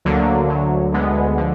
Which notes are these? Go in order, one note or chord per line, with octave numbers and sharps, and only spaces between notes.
D2 D3 F#3 A#3
D2 D3 F#3
D2 D3 G#3 B3
D3 F3